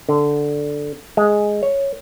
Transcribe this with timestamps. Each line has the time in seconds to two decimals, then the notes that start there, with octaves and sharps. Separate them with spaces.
0.09 D3
1.17 G#3
1.63 C#5